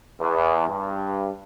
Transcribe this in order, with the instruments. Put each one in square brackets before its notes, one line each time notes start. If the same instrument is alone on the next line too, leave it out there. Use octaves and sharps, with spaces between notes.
[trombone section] E2
G2